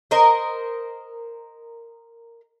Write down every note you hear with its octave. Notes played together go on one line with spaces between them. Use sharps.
A#4 C5 D#5